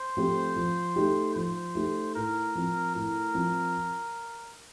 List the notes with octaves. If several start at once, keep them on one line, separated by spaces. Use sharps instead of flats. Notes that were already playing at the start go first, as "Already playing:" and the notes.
Already playing: C5
F3 A3 C4 G4
F3
A3 D#4 G4
F3 C5
A3 D#4 G4
A2 A#4
F3 C4
A2 A#4
F3 C4